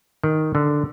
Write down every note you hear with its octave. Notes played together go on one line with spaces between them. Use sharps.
D#3
D3